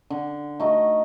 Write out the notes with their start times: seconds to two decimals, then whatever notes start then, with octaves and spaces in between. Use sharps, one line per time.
0.10 D3
0.60 A3 D#4 F#4